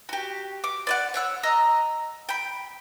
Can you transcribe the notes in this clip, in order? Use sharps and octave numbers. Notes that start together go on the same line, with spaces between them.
F#4 G4
D6
D5 D#5 F#5
C#5 F#5 E6
D#5 A#5 E6
G5 B5